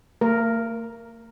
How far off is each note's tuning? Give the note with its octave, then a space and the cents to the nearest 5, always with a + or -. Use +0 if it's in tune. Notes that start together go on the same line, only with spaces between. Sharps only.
A#3 -45 A#4 +0